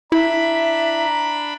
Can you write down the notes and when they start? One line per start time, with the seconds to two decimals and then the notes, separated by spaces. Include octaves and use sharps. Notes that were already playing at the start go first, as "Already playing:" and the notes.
0.12 D4 E4 E5 A#5 B5